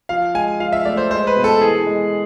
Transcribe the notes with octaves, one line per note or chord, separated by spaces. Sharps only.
F3 F5
G#3 G#5
F3 F5
E5
A3 D5
C5
G#3 C5
B4
B2
A4
E3 G#4
G#3